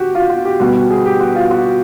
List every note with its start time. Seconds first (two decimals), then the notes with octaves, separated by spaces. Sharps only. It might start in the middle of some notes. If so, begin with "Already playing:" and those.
Already playing: F#4 G4
0.15 F4
0.30 F#4
0.45 G4
0.60 B2 G3 B3 F#4
0.75 F#4
0.90 G#4
1.06 G4
1.20 F#4
1.36 F4
1.51 F#4